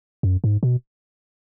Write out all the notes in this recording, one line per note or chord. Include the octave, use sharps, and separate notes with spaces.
F#2
G#2
B2